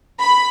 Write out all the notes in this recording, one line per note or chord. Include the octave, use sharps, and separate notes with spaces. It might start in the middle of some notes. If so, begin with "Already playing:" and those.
B5